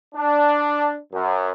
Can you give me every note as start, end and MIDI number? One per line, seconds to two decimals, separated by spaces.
0.15 0.98 62
1.13 1.51 42